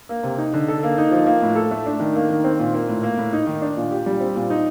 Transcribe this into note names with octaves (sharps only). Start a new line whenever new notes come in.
A#3
C3
D#4
D3
A4
A#3
D#4
F3
A#3
A2
A4
A3
D4
D#3
A#3
D#3
C4
A#2
A#3
A2
A#3
A2
D#4
D#3
D4
A#2
G4
G3
C4
A#2
D#4